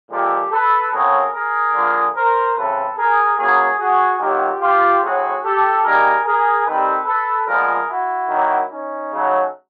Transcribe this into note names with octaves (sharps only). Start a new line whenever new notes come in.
A#2 F3 G#3 C4 G4 A4
A4 B4
C#3 F#3 A3 C4 G#4 A#4
G#4 A#4
D3 F3 A#3
A#4 C5
C#3 E3 A3 C4 A4 B4
G#4 A#4
C#3 F#3 A#3 F#4 G#4
F#4 G#4
D#3 F#3 A#3 F4 G4
F4 G4
A2 F#3 A3 C4 F#4 G#4
G4 A4
D#3 G3 A#3 G#4 A#4
G#4 A#4
D#3 G3 C4 A4 B4
A4 B4
A#2 F3 G#3 B3 G#4 A#4
E4 F#4
D#3 F#3 A#3
C#4 D#4
C#3 F#3 A3